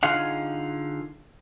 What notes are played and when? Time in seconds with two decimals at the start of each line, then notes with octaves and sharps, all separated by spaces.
0.03 D3 D#4 F4 G#4 F5 F#5